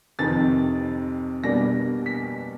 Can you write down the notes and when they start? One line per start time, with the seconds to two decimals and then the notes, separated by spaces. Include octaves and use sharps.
0.19 F2 C3 D#3 A6
1.44 B2 G3 A#3 D4 A#6
2.06 B6